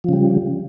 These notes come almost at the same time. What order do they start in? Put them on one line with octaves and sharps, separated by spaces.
F3 C#3 G3